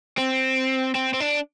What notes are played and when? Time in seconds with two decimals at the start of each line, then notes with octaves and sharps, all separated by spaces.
0.18 C4
0.95 C4
1.14 C4
1.20 D4